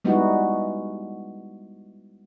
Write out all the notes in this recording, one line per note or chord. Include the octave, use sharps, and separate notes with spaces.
G3 G#3 B3 D#4 E4 F#4